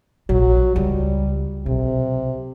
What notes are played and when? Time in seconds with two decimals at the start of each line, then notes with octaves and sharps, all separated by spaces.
0.29 A#1 F#3
0.76 C#2 G3
1.66 B1 C3